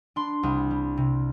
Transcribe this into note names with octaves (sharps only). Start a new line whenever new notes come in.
D4 C6
C2
G3
C3